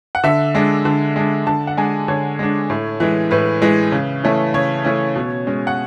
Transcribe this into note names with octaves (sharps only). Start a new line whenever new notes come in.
F#5
D3 E5
G#3 D4
D3
G#3 D4
D3 A5
F#5
G#3 D4 G#5
D3 C#5
G#3 D4
A2
E3 G#3
A2 B4
E3 G#3
C#3
E3 A3 C#4
C#3 C#5
E3 A3 C#4
B2
G#3 C#4
F#5